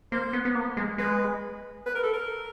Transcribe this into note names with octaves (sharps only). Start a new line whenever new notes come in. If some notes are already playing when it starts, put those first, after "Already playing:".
A#3 C5
B3
B3
A#3
G#3
G#3 B4
B4
A#4
A4
A#4